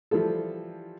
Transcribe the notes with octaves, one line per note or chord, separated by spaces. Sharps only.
E3 F3 G3 F4 A4